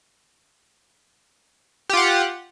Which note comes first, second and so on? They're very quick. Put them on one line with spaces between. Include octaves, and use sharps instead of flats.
G4 F4 F#5